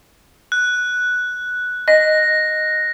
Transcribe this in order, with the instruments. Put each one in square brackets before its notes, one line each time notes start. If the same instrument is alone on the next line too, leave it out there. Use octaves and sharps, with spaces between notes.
[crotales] F#6
[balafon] D#5 [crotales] A#6